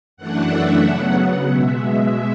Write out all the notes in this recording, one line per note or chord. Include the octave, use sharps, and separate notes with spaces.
F#2 E3 A3 D4 F#5
E5
C#3 F#3 B3 F#5
B2 G#3 E5